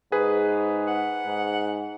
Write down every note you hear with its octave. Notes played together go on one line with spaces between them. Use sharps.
G#2 G#4 B4
F#5
G#2